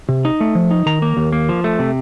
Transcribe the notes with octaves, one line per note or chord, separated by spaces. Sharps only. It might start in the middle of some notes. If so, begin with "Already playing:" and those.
C3
D#4
A3
F3
D#4
D#3 A#5
A#3
D#2
A#3
F3
A3
C3